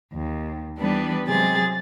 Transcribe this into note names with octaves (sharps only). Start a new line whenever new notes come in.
D#2
E3 G3 B3 D4 B4
C3 F#3 G#3 G#4 A6